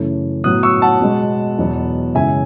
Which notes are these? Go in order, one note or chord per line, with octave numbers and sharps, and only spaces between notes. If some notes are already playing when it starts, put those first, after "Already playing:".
Already playing: F#2 C#3 E3 A3 C#4
A2 F#3 B3 D#6 F#6
C#6 E6
F#5 A5
B2 G#3 B3
E2 B2 F#3 B3
F#2 C#3 E3 G#3 E5 G#5